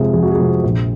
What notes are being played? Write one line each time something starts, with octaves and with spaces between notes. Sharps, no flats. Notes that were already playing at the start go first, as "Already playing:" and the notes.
Already playing: F2 C3 F3 G#3 G#4
F2 G#4
F#4
G#4
C3 F3 G#3
A#1